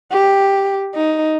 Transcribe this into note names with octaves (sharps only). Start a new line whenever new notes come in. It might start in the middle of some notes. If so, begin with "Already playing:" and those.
G4
D#4